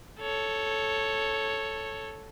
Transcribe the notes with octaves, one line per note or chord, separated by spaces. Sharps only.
A4 C#5